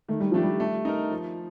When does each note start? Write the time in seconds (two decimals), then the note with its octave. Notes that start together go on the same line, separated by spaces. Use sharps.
0.09 D#3 A3
0.20 G3
0.32 F3 A3 D4 G4
0.43 G3
0.60 A3
0.85 D#4 A#4
1.11 F3